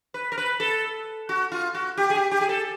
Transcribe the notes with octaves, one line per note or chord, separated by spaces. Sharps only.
B4
A#4
B4
A4
F#4
F4
F#4
G4
G#4
G4
G4
G#4
A4